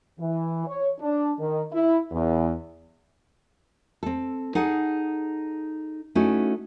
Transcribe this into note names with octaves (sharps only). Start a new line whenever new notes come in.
E3
C#5
D4
D#3
E4
E2
C4 A4
D#4 G#4 A4 F#5
A3 C#4 D#4 E4 F#4